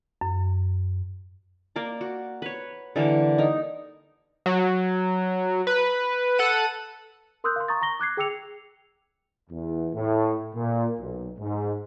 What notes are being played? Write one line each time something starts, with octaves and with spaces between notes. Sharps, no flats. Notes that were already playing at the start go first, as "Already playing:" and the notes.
F#2
A#3 A#4 D5
F#4
B4 C#5
D3 E3 G3 A#3
D#4 A#4
F#3
B4
A4 F#5 D#7
A#4 C6 D#6 E6 F#6 G6
F5 C6
A#5 C#6 D#6 A6
A#5 C#6 A#6 G7
D6 F#6 G#6 C7
G#4 G5 D6 E6 C#7 F7
E2
A2
A#2
B1
G#2